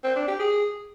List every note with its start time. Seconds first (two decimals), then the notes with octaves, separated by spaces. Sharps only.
0.04 C4
0.16 D4
0.28 G4
0.39 G#4